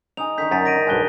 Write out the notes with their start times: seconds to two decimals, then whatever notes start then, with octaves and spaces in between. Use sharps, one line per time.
0.17 D#4 G5 G#5 D#6 F7
0.38 D3 D#3 D#4 G6 B6
0.51 F#2 G6 A6 B6
0.65 F#3 A#6 D7 D#7
0.87 B1 G2 G#5 F#6 G7